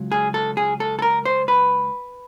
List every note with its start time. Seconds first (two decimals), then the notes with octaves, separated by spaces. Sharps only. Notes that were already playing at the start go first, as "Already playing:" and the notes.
Already playing: C#2 F#3
0.12 G#4
0.34 A4
0.57 G#4
0.80 A4
0.99 A4
1.02 A#4
1.25 C5
1.48 B4